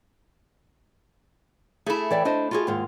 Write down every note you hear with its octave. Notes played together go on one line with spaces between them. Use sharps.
A3 E4 G#4
E3 D5 G5
D4 C5 D#5
F4 F#4 G#4
D#2 G#2 F4